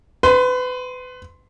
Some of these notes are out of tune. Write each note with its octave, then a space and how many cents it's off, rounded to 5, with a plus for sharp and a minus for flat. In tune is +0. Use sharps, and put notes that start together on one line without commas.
B4 +30 C6 +0